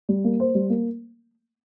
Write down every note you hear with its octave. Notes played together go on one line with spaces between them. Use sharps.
G3
A#3
C5
G3
A#3